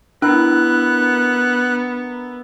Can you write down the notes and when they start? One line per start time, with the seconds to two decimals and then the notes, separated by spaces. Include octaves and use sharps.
0.22 B3 D4 E4 A#4 F#6